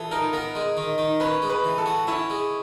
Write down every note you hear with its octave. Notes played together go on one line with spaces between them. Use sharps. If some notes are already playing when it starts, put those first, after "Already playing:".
Already playing: E3 E4 F4 G#4 A4
D#4 A#4
B3 A#4
G#3
D#3
D#3
C#4 B4
G#3
B4
E3
A4
F#4
C#4 E4
G#3